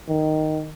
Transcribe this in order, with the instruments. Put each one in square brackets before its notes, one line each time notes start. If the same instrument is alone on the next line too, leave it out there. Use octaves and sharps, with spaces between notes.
[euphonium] D#3